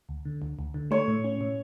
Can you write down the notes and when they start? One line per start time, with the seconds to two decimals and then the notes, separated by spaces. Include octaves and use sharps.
0.09 D2
0.25 D3
0.42 D2
0.59 D2
0.74 D3
0.91 A3 C#5
1.08 A2
1.24 C#4
1.41 A2